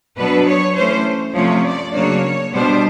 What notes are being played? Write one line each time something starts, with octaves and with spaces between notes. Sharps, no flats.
B2 F#3 B3 D4 B4
C#5
E3 A3 C#4 C5
C3 F3 A3 C#4 C#5
D5
C#3 F#3 A#3 D4 C#5
B2 G3 B3 D4 C5